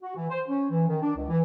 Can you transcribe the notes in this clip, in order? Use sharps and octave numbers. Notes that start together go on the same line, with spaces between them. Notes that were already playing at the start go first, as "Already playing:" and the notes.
F#4
E3
C5
C#4
E3
D#3
D4
C#2
E3